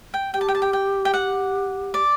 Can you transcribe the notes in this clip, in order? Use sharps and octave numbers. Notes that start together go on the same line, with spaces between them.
G5
G4 G5
A5
G5
A5
G5
G5
G5
F#5
D5